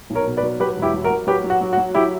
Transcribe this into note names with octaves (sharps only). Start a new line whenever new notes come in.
B1
A#4 C#5
B2
B4 D5
F#3
F#3 G4 B4
E1
E4 G4
F#3
F#4 A#4
F#3
F#3 G4 B4
F#3
F#4
F#3
F#4
F#3
F#3 E4 G4